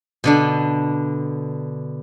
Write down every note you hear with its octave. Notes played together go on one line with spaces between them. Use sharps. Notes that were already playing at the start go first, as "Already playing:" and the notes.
B2 D3 D4